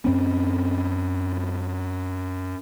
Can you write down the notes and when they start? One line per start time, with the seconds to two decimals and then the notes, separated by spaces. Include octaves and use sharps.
0.05 F#2 C4 C#4